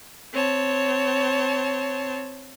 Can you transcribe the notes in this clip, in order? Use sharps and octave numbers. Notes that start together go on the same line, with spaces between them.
C4 C#5 A5